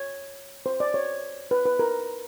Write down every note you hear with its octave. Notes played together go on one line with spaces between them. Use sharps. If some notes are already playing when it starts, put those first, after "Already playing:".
Already playing: C#5
C5
D5
C#5
B4
B4
A#4